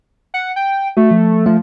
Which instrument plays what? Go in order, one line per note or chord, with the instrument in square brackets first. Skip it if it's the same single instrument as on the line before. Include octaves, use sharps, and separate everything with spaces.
[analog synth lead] F#5
G5
[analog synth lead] A3 [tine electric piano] F#4
[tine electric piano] F3
[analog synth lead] F3 [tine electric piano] A3